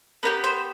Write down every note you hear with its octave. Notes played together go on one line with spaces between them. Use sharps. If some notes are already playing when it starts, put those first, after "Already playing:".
B3 D#4 G4 A#4
C5